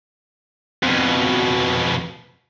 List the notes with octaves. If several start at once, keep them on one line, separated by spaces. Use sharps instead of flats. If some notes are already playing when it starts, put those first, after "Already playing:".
F2 B2